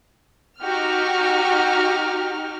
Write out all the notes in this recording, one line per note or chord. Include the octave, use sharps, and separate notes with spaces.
D#4 F#4 G4 F6